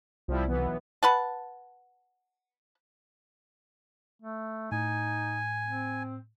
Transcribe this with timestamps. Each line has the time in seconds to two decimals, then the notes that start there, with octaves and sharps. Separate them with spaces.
0.28 C2 F3 G3 E4
0.48 B1 E3 B3
1.03 B4 F#5 A5
4.22 A3
4.72 A2 D#4 G#5
5.65 C4